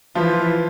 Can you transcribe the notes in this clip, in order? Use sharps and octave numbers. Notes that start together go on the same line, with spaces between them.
E3 F3 F4